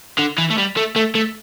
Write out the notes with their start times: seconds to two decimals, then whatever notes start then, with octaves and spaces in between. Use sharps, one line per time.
0.19 D3
0.38 E3
0.50 A3
0.58 G3
0.77 A3
0.96 A3
1.15 A3